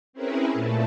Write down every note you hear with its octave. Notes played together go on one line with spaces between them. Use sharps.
C4 C#4 E4 G#4 A#4 B4
A#2 A3 A4